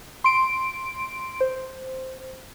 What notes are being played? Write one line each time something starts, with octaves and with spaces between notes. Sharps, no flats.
C6 D7
C5